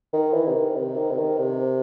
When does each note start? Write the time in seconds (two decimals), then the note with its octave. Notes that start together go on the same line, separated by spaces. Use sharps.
0.13 D#3
0.34 E3
0.47 C3
0.55 D#3
0.76 C3
0.97 D#3
1.11 C3
1.18 D#3
1.39 C3